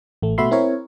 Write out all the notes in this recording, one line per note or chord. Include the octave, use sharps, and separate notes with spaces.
A1 A3
B2 A3 F#4 E5 B5 C6
C4 E4 A#4 C#5